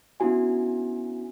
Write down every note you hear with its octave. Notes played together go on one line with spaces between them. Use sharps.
B3 C#4 D4 E4 F#4 G#5